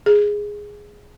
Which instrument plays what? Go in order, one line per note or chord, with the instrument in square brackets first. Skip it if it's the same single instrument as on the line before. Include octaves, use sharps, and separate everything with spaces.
[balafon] G#4